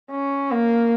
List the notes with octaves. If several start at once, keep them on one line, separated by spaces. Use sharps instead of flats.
C#4
A#3